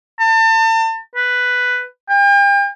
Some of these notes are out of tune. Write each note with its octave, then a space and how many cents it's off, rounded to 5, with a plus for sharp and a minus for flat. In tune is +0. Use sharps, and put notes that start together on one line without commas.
A5 +35
B4 +5
G5 +40